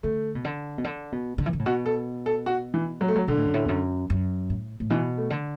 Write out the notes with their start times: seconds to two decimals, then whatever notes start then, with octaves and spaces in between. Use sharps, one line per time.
0.03 D3 A3
0.35 B2
0.45 D3
0.78 B2
0.84 D3
1.12 B2
1.38 D3
1.46 E3
1.53 D3
1.59 A2
1.66 B2 F#4
1.86 A4
2.26 A4
2.46 F#4
2.74 E3
3.01 F#3
3.08 A3
3.16 F#3
3.28 B2 D3
3.37 A2
3.46 F#2
3.54 A2
3.65 E2
3.69 F#2
4.10 F#2
4.50 A2
4.80 A2
4.90 B2 E3
5.17 A3
5.30 D3